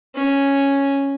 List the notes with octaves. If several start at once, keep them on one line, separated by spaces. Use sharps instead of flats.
C#4